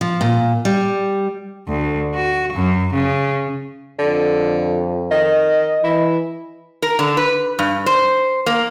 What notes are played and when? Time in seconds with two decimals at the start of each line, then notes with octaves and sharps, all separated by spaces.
0.01 F3
0.21 A#2
0.65 G3
1.68 D2
2.15 F#4
2.53 F#2
2.94 C#3
3.99 F2 D3
5.11 D#3 D#5
5.84 E3 E4
6.82 A#4
6.99 D3
7.17 B4
7.59 G2
7.86 C5
8.46 A#3